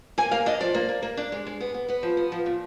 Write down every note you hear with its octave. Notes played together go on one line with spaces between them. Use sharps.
A#3 G#5
A#3 F5
D4 D#5
F3 D5
A#3
A#3
A#3
D4
G#3
G#3
B3
B3
B3 B4
F3
B3
F3
A#2